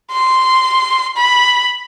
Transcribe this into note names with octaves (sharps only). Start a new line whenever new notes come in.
C6
B5